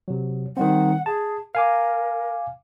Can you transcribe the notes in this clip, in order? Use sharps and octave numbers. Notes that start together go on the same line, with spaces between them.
C3 F#3
D#3 G3 C4 F#5
G#4 A5
A#4 F5 G#5 D6